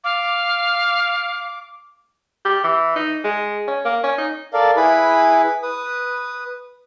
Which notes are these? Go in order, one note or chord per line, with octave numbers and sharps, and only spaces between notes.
F5 D6
G4
E3
D#4
G#3
C#4
A#3
C#4
D#4
A4 A#4 D5 F5
E4 G#4 B4 B5
B4 D#6